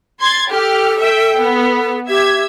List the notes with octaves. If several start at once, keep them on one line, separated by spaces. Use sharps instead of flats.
C6 G#6 A6
G4 A4 F6
E5 G5
B3
G4 E5 G#6